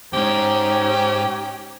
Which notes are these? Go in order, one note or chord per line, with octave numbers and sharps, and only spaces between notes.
E2 G#2 C#4 D#4 G4 C5